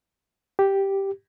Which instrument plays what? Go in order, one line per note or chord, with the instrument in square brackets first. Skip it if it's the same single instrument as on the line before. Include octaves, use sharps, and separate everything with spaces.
[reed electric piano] G4